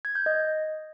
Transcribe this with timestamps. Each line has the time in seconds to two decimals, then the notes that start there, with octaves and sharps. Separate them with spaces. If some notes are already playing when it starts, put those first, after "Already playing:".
0.05 G#6
0.15 G6
0.26 D#5